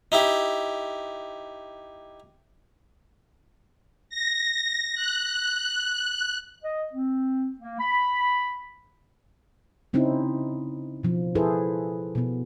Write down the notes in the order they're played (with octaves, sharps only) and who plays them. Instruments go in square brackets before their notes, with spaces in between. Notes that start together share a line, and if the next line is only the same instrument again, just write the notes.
[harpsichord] D#4 E4 G4
[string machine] A#6
F#6
[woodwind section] D#5
C4
A#3
B5
[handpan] C#3 C4 C#4 D#4 E4
B2 F3
E4 G#4 A4 B4 C5
B2 B3